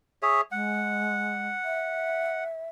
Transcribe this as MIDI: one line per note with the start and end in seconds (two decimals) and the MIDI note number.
0.22 0.41 68
0.22 0.41 73
0.22 0.41 76
0.52 1.47 56
0.52 2.44 78
1.65 2.69 76